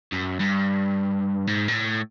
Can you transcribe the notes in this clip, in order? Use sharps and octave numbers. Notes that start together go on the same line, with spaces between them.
F#2
G2
G#2
A#2
A2